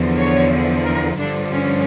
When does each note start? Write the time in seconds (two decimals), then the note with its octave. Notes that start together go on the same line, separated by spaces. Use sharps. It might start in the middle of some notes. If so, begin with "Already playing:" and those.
Already playing: E2 D3 F3
0.17 C#5
0.84 A#4
1.17 G2 D3 F3 D4
1.51 C#4